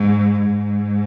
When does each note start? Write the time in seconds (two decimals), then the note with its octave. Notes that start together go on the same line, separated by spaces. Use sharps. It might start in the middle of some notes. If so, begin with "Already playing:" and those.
Already playing: G#2
0.40 G#2